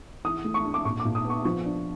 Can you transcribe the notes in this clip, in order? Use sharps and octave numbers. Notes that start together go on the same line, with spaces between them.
E3 D#6
A3
C#6
D4
D6
A#2 C#6
D6
A#2
D#6
B3 C#6
F3 C#6
D4